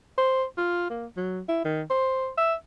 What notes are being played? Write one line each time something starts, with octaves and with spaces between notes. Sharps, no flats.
C5
F4
A#3
F#3
E4
D#3
C5
E5